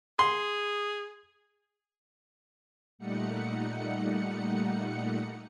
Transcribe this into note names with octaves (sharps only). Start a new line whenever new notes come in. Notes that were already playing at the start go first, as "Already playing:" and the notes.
G#4 C6
A#2 G3 A3 D#4 F#5 C#7